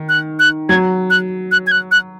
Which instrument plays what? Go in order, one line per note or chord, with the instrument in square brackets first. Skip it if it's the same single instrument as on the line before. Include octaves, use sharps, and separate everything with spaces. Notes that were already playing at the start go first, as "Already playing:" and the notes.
Already playing: [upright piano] D#3
[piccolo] F#6
F#6
[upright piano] F#3 [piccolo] G#6
[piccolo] F#6
F#6
G#6
F#6
F#6